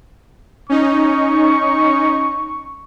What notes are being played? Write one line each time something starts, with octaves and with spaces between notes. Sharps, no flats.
C#4 D#4 C#6